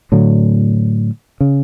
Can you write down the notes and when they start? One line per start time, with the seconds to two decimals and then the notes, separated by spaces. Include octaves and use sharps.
0.12 A2 D3 F#3
1.41 C#3